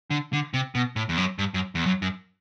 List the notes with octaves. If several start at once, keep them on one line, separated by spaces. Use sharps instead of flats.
D3
D3
C3
B2
A2
E2
F#2
G2
F#2
E2
F#2
F#2